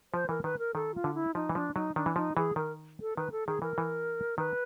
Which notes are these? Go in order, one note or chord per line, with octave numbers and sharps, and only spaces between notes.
F3 C5
E3 A#4
D#3 B4
A#4
D#3 A4
F4
D3
E4
F3 D#4
E3
F3 D4
F#3 D#4
D#3 D4
E3
F3 D#4
E3 G#4
D#3 A#4
A4
D#3 B4
A4
D#3 G#4
E3 A#4
E3
D#3 B4